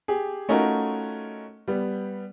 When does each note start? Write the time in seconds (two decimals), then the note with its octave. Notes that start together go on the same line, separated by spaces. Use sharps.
0.08 G4 G#4
0.49 A3 C#4 D#4 F4 F#4 A#4
1.68 G3 B3